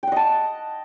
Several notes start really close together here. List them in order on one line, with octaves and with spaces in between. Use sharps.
G5 F#5 D#5 A5